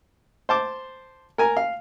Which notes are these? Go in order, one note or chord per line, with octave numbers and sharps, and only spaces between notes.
C5 A5 D6
A#4 G#5 A#5
F5